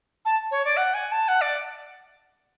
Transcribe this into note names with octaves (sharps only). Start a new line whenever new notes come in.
A5
C#5
D5
F#5
G#5
A5
F#5
D5